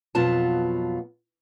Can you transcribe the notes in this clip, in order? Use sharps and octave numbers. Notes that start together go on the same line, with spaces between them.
F2 B2 F#3 B3 F4 A5